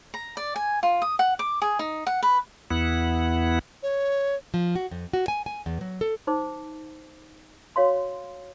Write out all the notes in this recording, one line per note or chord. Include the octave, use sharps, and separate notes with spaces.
A#5
D5
G#5
F4
D#6
F#5
D6
G#4
D#4
F#5
B4
E2 B3 E4 F#5
C#5
F3
F#4
F2
F#4
G#5
G#5
E2
F#3
A4
D#4 C5 D6
F#4 C#5 F5 C6